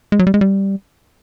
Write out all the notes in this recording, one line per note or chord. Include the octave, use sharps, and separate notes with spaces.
G#3
F#3
G3
G#3
G3